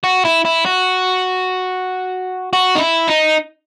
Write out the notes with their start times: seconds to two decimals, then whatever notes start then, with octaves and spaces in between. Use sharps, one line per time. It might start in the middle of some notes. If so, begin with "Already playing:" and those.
0.04 F#4
0.25 E4
0.45 E4
0.66 F#4
2.53 F#4
2.76 D#4
2.80 E4
3.08 D#4